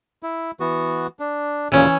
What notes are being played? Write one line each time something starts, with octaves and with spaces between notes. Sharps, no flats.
E4
E3 B3 F#4
D4
D#2 A#2 C#3 E3 C#4